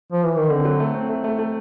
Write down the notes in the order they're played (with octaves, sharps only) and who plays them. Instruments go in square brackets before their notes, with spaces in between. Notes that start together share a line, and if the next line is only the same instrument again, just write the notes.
[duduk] F3
E3
D#3
[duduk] D3 [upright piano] C4
[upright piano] F#3
A3
C4
A3
A3
A3